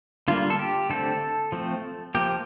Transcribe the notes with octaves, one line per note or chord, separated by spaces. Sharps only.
D3 G3 A#3 F4
A4
G4
D3 A3 C4 A4
F3 A3 C4
F3 A#3 G4